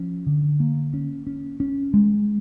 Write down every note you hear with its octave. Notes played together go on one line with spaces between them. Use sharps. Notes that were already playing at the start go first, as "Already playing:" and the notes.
Already playing: F3 C#4
D3
A#3
C#4
C#4
C#4
G#3